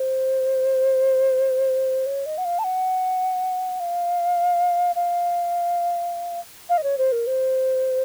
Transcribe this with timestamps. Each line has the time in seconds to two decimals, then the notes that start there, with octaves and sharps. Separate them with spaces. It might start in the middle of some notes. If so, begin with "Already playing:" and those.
Already playing: C5
2.06 C#5
2.26 D#5
2.38 F#5
2.45 F5
2.59 A5
2.64 F#5
3.80 F5
4.95 F5
6.69 F5
6.78 D#5
6.83 C#5
6.98 C5
7.12 A#4
7.27 C5